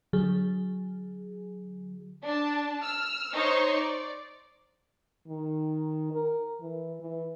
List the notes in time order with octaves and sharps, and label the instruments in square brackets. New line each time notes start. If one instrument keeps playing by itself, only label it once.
[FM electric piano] D3 F#3 G#4
[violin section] D4 A5
E6 F6
D#4 C5 C#5 C6 C#6
D5
[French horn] D#3
A#4
E3
E3